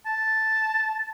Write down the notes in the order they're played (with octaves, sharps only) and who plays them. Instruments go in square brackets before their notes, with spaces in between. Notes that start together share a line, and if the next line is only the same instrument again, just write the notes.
[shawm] A5